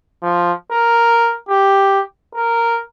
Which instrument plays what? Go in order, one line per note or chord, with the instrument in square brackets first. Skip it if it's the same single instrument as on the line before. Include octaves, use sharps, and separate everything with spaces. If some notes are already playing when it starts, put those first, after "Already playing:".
[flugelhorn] F3
A#4
G4
A#4